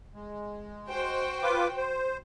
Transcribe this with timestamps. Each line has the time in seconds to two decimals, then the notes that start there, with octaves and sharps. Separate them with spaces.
0.14 G#3
0.88 F#4 C5 G5
1.42 F4 B4 D6
1.77 C5